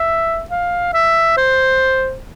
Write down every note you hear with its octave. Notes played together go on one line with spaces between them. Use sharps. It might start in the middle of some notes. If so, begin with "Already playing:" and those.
Already playing: E5
F5
E5
C5